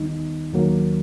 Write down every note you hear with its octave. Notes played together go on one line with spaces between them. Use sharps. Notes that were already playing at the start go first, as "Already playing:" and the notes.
Already playing: D#2 D#3 G3 B3 D#4
D#2 D#3 F#3 A#3